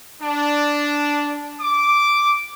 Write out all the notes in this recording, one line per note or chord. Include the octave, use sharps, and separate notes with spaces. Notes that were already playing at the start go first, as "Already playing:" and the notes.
D4
D6